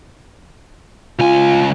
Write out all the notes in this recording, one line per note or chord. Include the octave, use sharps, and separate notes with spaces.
C#2 F4 G#5